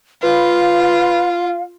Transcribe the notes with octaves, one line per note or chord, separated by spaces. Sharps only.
F4 B4 F5